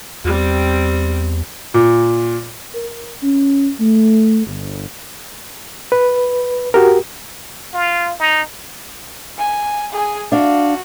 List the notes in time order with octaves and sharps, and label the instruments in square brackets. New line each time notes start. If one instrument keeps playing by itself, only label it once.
[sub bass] E2 [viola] G3 C4
[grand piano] A#2
[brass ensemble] A#4
C#4
A3
G1
[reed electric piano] B4
F#4 G4 A#4
[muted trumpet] F4
D#4
[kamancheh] G#5
G#4 G#5
[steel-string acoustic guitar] D4 F5 [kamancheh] F#4